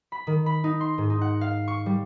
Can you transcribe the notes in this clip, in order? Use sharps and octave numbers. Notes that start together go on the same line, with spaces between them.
B5
D#3
B5
D#4
C6
G#2
D#4
F#5
F5
C#6
G3